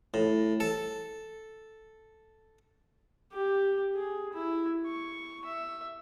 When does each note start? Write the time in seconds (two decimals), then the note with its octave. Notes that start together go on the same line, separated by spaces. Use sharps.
0.14 A2
0.60 A4
3.32 G4
3.95 G#4
4.33 E4
4.86 C#6
5.45 E5